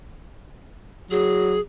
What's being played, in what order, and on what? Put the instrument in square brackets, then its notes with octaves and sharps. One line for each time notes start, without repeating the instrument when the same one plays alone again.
[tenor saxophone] F#3 [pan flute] G#4